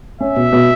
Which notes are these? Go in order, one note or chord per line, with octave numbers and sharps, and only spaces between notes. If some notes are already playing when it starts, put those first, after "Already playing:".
C#4 E5
B2
B2